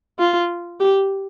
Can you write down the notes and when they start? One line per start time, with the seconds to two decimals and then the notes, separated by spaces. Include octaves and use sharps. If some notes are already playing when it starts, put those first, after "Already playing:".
0.19 F4
0.80 G4